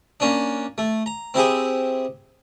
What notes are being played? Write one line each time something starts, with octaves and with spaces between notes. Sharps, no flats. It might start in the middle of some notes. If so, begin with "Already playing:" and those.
A#3 C#4 D4
A3
A#5
C4 E4 G4 G#4